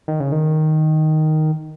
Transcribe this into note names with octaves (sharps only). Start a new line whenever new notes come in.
D#3
C#3
D#3